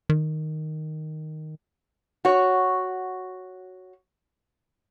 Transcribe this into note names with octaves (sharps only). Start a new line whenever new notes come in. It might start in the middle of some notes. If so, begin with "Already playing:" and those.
D#3
F#4 C#5